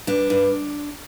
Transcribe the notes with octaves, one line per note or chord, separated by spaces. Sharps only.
G2 D4
G2